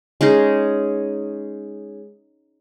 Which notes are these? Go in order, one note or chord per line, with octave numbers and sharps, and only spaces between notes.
G#3 C#4 D#4 G#4